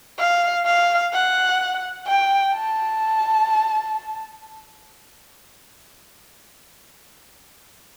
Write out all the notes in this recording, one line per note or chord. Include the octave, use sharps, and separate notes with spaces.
F5
F5
F#5
G5
A5